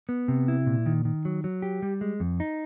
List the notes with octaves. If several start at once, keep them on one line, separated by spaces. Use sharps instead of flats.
B3
C3
E4
A#2
D#3
D#3
F#3
F#3
G4
G3
G#3
F2
D#4